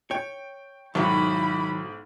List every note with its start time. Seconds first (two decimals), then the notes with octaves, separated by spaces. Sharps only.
0.11 C#5 G5
0.95 B1 G#2 D#3 F#3 E4 B5